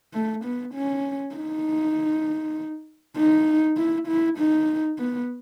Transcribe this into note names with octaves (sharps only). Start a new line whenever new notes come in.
A3
B3
C#4
D#4
D#4
E4
E4
D#4
B3